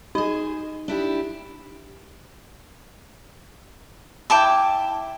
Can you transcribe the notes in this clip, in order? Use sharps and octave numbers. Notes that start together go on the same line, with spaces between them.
D#4 G#4 C5 D#5
D4 E4 G4
E4 G5 A5 D6